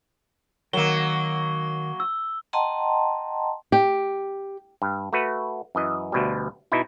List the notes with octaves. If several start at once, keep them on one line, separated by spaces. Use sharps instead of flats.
D#3 F#3 A#3 A#4 G7
E6
D#5 F#5 G5 A5 A#5 C6
G4
G2
A3 F#4 B4
F#2 E3 D#5
D2 B2 G3
B2 D#4 E4